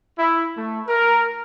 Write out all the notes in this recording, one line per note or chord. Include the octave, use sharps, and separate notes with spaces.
E4
A3
A#4